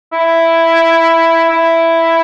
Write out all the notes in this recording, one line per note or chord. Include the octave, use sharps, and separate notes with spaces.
E4
E4